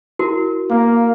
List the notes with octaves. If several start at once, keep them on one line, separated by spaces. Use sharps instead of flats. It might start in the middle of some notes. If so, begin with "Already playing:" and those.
E4 F#4 A#4
A#3